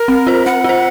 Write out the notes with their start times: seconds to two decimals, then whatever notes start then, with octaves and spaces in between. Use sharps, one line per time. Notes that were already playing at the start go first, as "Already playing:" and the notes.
Already playing: A#4
0.08 C4
0.27 F4 C5
0.46 C4 F#5
0.64 F4 C5